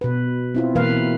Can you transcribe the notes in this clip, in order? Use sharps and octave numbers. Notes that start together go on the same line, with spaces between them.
B2 B4
C4 E4 F4
B2 E3 A#3 B4 F5